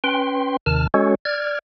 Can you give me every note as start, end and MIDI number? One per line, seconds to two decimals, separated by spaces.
0.04 0.57 61
0.04 0.57 71
0.04 0.57 79
0.04 0.57 84
0.66 0.87 39
0.66 0.87 48
0.66 0.87 51
0.66 0.87 81
0.66 0.87 89
0.94 1.15 56
0.94 1.15 61
0.94 1.15 66
0.94 1.15 69
0.94 1.15 73
1.25 1.59 74
1.25 1.59 89
1.25 1.59 92